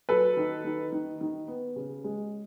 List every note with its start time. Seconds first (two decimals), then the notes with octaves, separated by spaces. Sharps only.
0.09 F#3 A4 B4
0.37 D#3
0.65 D#3
0.92 D#3
1.21 D#3
1.48 B3
1.76 C#3
2.04 G#3